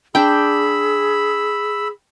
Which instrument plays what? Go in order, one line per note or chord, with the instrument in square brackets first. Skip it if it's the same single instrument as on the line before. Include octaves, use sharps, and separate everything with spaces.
[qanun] D4 G5 [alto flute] G#4 [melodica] B5 E6